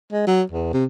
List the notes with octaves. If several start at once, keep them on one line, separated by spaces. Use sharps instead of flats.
G#3
F#3
E2
C3